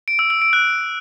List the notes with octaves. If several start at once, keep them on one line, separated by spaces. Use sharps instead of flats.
D7
E6
E6
D7
F#6